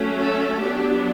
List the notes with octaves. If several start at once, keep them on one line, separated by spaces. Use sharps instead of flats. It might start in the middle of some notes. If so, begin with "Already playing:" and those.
Already playing: F#3 A3 C#4
A4
F#3 B3 D4 G4